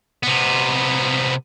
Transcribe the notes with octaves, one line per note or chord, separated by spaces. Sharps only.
C3 B3